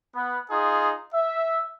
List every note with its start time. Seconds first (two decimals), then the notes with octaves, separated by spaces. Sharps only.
0.14 B3
0.49 D#4 F4 G#4
1.14 E5